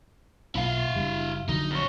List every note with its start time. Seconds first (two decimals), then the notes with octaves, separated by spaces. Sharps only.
0.55 B1 A#2 E4 F5
0.95 F#1 G3
1.49 A#1 D3 F#3 D#4
1.71 F2 C#5